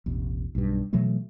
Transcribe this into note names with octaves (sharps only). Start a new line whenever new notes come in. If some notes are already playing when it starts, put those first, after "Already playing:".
E1 A1
B1 G2
B2 E3 F#3 A3